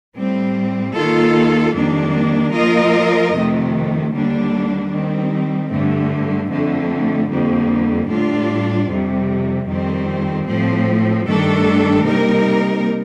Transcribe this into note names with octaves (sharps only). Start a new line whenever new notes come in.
A2 G3 C4
D#2 D#3 A#3 F4 A4
F2 D#3 G3 A#3 D4
F3 A#3 F4 A#4 D#5
F2 C3 D#3 A3
D#2 D3 G3 A#3 D4
D#3 G3 C4
G2 D3 A3
F2 D3 A3
F2 D3 G3 A#3
A2 G3 D4 F4
F2 C3 G3
F2 D#3 G3 C4
A2 F3 C4
G2 D#3 A3 D4 A4
C3 G3 A#3 D#4 A#4